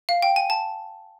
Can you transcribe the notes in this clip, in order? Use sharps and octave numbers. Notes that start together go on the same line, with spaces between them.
F5
G5
G#5
A5